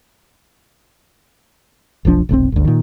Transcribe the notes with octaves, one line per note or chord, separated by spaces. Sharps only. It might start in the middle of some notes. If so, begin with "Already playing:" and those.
F1 B1 F3 D4
F1 B1 A#2 C4
G1 D2
A#2 D#3